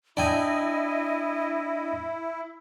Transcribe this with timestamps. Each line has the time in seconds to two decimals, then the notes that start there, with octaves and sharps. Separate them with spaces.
0.17 D4 E4 D5 D#5 G5 G#5